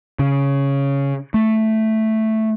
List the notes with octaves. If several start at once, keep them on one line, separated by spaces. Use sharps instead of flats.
C#3
A3